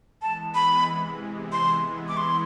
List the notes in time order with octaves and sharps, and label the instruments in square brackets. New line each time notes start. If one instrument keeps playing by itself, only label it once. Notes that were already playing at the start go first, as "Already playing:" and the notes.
[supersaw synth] E3 G#3 B3 [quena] A5
[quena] B5
[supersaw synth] C3 E3 G#3
[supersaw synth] E3 G#3 B3 E4 [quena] C6
[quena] D6
C6